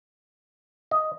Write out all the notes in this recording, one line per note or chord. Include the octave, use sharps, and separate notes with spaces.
D#5